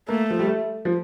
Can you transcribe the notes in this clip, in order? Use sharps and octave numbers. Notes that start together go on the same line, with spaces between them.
A3 A#3
F3
G3
A3
F3